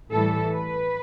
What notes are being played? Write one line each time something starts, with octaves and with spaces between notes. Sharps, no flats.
A2 E3 G3 A4
B4